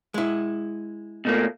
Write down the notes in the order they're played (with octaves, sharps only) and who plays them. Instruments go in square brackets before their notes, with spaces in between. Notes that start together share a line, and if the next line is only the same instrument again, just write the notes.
[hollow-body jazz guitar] G#3 E4
[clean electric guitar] B2 A3 A#3